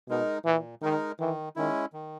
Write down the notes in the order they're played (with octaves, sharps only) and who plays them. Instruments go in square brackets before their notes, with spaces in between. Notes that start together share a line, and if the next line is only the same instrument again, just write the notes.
[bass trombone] B2 [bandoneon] G#3 D#4 A#4
[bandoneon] A#2 [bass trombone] E3
[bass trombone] D#3 [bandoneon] G#3 D#4 A#4
[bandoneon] D#3 [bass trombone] E3
[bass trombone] D#3 [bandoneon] G#3 C#4 E4
[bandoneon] D#3